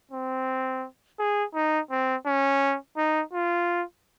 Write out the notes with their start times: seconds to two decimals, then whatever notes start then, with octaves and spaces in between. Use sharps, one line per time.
0.11 C4
1.19 G#4
1.55 D#4
1.91 C4
2.26 C#4
2.97 D#4
3.33 F4